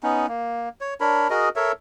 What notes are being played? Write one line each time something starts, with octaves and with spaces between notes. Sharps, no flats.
B3 C#4 D#4
A#3
C#5
D4 A#4 C#5 B5
F#4 G#4 A#4 D#5
A4 A#4 C#5 E5